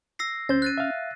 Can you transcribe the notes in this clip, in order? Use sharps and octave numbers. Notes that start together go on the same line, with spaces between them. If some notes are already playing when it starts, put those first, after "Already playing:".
E6 A#6 C7
D2 C#4 C5 G6 A6
F#6 A6 D#7
E5 F5